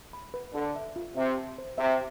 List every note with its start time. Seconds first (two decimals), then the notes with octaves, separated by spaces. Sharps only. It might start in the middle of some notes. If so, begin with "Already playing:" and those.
0.13 B5
0.34 B4
0.54 D3 A4
0.76 E5
0.96 F4
1.16 C3 E5
1.38 A5
1.58 C5
1.78 C3 E5